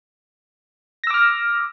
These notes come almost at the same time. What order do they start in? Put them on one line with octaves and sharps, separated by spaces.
A#6 E6 D6 F6